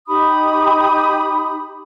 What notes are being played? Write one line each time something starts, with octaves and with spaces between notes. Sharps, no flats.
D#4 G4 B5 D#6